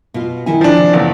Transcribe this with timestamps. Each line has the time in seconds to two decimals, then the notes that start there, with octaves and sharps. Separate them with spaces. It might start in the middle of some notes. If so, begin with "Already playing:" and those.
0.14 B2 F4
0.46 D#3 E4 G#5
0.61 F3 D4
0.77 C3
0.93 F#1 D3 E3 B3